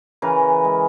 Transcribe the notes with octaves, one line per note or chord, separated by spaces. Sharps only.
C#3 E3 A#4 B4
G#3